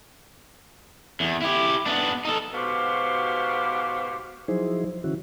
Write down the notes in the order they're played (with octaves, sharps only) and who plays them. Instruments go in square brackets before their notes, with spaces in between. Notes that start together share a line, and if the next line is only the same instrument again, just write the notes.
[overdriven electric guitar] E2
E4 G4
B3 D4
D#4 A4
[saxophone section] G#2 B2 F#4 G4 C5 F5
[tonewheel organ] F3 F#3 D#4 E4 G#4 C5
D3 E3 C#4 E4 F#4